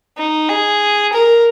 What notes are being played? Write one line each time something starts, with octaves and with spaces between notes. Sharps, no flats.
D#4
G#4
A#4